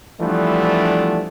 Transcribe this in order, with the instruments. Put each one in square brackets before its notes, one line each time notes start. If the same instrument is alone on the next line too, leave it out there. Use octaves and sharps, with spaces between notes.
[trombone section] E3 F3 G3 A3 B3 D4